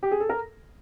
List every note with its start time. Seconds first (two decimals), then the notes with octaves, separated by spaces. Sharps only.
0.03 G4
0.11 G#4
0.20 A4
0.29 A#4